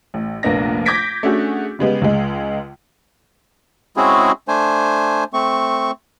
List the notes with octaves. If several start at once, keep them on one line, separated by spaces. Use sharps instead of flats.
A1
F1 A#1 A#3 B3 D4 A#6
D6 G6 G#6 A#6 B6 D7
A3 C#4 D4 F#4 G#4
C#3 G3 G#3 B3
C#2 G#3
G#3 C4 C#4 E4 F#4 G#4
A3 D4 C5 G#5
A3 C4 C#6